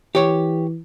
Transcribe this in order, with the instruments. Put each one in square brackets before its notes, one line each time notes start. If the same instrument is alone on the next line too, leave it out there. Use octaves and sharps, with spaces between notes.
[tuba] E3 [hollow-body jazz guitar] G4 C#5